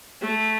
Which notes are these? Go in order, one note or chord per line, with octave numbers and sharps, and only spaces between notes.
A3